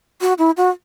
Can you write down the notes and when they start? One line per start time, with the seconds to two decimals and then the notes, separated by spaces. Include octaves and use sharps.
0.21 F#4
0.38 E4
0.57 F#4